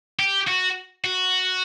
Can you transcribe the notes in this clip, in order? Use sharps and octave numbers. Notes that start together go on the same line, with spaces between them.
G4
F#4
F#4